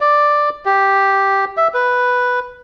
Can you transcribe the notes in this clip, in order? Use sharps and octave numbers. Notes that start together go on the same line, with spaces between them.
D5
G4
E5
B4